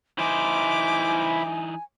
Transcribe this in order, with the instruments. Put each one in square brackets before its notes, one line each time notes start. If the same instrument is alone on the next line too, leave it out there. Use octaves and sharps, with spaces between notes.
[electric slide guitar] E3 D#4 [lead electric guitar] E4 C5 [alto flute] G#5 [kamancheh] D6